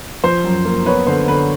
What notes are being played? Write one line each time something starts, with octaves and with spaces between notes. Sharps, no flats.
F3 C5
F#2
A#3
B3 B4 C#5
D3 C5
D3 B4